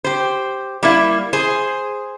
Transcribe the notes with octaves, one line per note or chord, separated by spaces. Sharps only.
G4 C5
G3 A#3 E4
G#4 C5